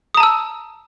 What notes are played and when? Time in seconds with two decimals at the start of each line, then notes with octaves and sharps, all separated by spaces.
0.14 D#6
0.17 A#5
0.20 A5
0.23 E6